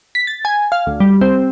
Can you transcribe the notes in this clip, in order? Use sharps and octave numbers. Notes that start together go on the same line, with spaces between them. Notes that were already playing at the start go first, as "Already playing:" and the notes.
B6
A6
G#5
F5
D2
G3
C4